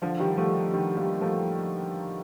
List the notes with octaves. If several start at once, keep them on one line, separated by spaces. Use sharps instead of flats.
D3 F3
D#3 G3
F3 A3
D#3 G3
G3 A#3
F3 A3